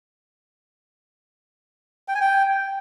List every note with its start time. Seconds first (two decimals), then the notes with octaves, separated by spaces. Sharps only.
2.08 G5
2.15 G#5
2.21 G5